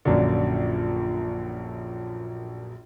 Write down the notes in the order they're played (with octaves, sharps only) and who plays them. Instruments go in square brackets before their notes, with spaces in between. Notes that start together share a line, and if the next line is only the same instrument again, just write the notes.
[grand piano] A#1 F#2 A#2 D3